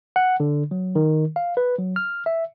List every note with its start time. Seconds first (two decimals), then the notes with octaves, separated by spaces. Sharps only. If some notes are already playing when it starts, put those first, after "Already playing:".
0.16 F#5
0.40 D3
0.71 F#3
0.95 D#3
1.36 F5
1.57 B4
1.78 F#3
1.96 F6
2.26 E5